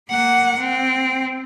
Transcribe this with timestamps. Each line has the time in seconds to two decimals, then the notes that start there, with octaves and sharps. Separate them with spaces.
0.11 A#3 F#5
0.60 C4